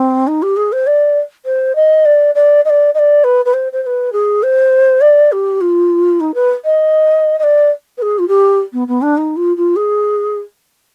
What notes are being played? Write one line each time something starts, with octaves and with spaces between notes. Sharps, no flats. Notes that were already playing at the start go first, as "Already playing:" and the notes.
Already playing: C4
D#4
G4
G#4
C5
D5
C5
D#5
D5
D5
D#5
D5
D#5
D5
B4
B4
C5
C5
C5
B4
G#4
C5
D5
G4
F4
D#4
B4
D#5
D#5
D5
B4
G#4
F4
G4
B3
B3
D4
D#4
F4
F4
G#4